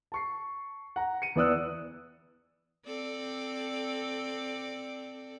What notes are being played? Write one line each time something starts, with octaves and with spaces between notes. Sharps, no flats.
A5 C#6 C7
F#5 A#5
C#7 D#7
E2 E3 D5 D#6 E6 F#6
C4 A4 D5